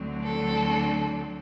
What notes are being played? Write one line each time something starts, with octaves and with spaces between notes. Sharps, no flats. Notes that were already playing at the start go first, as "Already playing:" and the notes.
Already playing: D2 D3 F#3 C4
A4